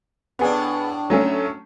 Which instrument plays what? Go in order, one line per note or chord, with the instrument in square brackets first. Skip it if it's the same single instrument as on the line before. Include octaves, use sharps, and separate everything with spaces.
[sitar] A2 D4 [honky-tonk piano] B3 G#4
[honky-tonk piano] F#3 A3 C#4